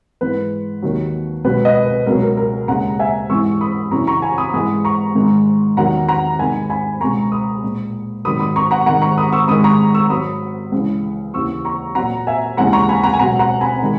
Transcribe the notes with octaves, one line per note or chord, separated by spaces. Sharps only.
G#2 E3 G#3 B4
D#2 D#3 F#3
C#2 B2 F#3 B4
B4 D#5
B4
C#2 B2 F#3 A#4
A#4
A#4
D#2 C#3 G#3 F#5 A#5
E5 G#5
G#2 E3 G#3 C#6 E6
B5 D#6
F#2 C#3 E3 A#5 C#6
A#5 C#6
G#5 B5
B5 D#6
G#2 E3 G#3 B5 D#6
A#5 C#6
G#2 D#3 G#3
E2 D#3 F#3 F#5 A#5
F#5 A#5
G#2 D#3 G#3 G#5 B5
G#5 B5
C#2 B2 G#3 A#5 C#6
B5 D#6
A#2 G#3
G#2 D#3 F#3 B5 D#6
B5 D#6
A#5 C#6
F#5 A#5
G#2 D#3 G#3 F#5 A#5
A#5 C#6
B5 D#6
C#6 E6
G#2 D#3 G#3 B5 D#6
A#5 C#6
C#6 E6
G#2 F#3 B5 D#6
C#2 C#3 E3
D#2 C#3 E3 C#6 E6
A#5 C#6
A#2 F#3 F#5 A#5
E5 G#5
D#2 C#3 E3 G#3 F#5 A#5
A#5 C#6
G#5 B5
F#5 A#5
G#5
C#2 B2 F#3 F#5 A#5
F#5 A#5
G#5 B5
D#3 G#3